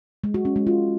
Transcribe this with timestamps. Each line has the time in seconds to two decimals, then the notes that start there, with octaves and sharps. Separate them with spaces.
0.24 G#3
0.34 F#4
0.45 C#4
0.56 G#3
0.67 F4